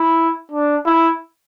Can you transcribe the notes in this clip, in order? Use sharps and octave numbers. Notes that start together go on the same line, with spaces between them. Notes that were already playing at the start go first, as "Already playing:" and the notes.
Already playing: E4
D4
E4